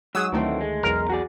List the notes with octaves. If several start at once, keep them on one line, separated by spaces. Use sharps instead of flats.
G#2 F#3 G#4 D#6 E6
D2 D#3 E3 A3 C4
G#3
B1 E2 A#4
F#4 G#4 D5